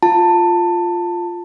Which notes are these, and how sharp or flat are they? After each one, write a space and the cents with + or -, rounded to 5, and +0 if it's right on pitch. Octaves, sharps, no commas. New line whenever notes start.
F4 +0 A5 +20